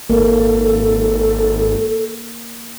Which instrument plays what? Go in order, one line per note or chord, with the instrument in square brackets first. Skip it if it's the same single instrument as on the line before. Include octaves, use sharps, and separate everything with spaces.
[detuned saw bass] G#1 [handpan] A#3 [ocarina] A4